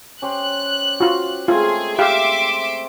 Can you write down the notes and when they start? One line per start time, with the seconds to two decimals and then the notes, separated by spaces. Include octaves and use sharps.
0.22 C#4 G4 C5 F#6
1.00 F4 F#4
1.48 G#3 A3 C4 F4 G#4
1.99 G4 E5 F5 C6 D6